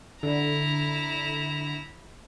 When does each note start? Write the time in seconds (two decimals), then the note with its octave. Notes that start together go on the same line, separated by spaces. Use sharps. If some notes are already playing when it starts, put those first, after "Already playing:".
0.23 D3 E4 A#5